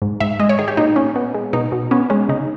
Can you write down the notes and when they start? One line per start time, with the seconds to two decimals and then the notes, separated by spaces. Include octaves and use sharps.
0.02 G#2
0.20 G#2 E5
0.39 G#3 D#5
0.49 C#5
0.59 D#3 G#4
0.68 G4
0.77 A#2 D#4
0.96 A#2 C#4
1.16 B3
1.35 G#3
1.53 B2 D#4
1.72 B2
1.91 B3 C#4
2.10 G#3 C#4
2.29 C#3 D#4